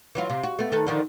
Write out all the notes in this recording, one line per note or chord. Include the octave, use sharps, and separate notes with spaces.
E3 F#3 F4
C3
F#4
A3 B3
D#3 A4 B4
D3 D#3 F3